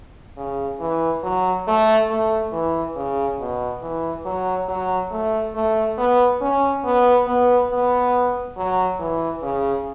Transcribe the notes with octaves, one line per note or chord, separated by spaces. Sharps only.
C#3
E3
F#3
A3
A3
E3
C#3
B2
E3
F#3
F#3
A3
A3
B3
C#4
B3
B3
B3
F#3
E3
C#3